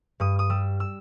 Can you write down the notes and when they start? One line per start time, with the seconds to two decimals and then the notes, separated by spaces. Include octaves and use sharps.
0.20 G2 D#6
0.39 D#6
0.50 G3 E6
0.80 E6